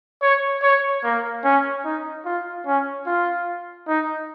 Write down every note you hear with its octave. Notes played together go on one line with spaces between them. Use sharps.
C#5
C#5
A#3
C#4
D#4
F4
C#4
F4
D#4